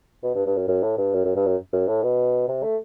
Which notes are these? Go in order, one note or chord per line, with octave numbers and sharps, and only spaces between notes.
B2
G2
G2
F#2
F#2
A2
G2
F#2
F#2
G2
F#2
F#2
A2
B2
C3
A3